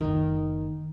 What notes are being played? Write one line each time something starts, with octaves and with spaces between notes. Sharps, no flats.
F#1 D#3